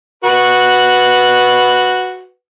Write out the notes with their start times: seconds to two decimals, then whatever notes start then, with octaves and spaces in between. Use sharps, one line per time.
0.24 F#4 B4